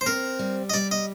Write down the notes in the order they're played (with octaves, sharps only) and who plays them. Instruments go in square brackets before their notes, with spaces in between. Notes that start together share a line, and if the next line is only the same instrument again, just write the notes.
[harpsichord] C5
[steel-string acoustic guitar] C4 [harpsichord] A#4
[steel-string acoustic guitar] G3
[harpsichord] D#5
[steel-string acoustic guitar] G3 [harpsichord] D5
[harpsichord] D#5